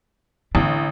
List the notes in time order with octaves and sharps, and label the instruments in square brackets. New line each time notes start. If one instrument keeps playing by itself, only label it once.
[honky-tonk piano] A1 [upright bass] D3 D4